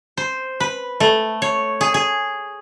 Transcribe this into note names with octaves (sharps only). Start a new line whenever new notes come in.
C5
B4
A3
C#5
G#4
G#4